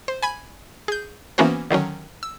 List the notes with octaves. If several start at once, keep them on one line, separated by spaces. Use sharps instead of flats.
C5
G#5 B5 G#6
G#4 G6
E3 A#3 B3 C#4 F#4 C5
D3 D#3 F#3 C#4
E6